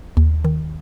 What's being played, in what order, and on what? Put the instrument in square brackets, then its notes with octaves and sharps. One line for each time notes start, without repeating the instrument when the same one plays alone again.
[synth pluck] D#2
D#3